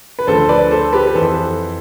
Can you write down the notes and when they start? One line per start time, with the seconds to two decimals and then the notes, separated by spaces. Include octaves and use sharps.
0.19 B4
0.27 D2 D3 F3 A4 C5
0.49 B4 D5
0.71 A4 C5
0.93 G4 B4
1.07 B4
1.15 F2 E3 A4 C5